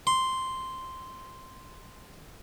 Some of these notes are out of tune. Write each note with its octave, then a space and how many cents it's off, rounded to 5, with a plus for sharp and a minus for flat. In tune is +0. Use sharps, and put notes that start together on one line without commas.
C6 -5